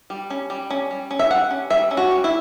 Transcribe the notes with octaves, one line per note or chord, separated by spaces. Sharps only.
G3
C#4
G3
C#4
G3
C#4
E5
G3 F#5
C#4
G3 E5
C#4
F#4
G3
E4